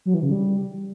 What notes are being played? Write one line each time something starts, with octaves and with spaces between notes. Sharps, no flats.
F#3
E3
C#3
G3